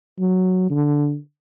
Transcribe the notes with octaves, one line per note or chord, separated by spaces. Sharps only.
F#3
D3